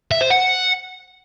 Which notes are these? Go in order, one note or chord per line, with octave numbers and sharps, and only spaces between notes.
E5
C5
F#5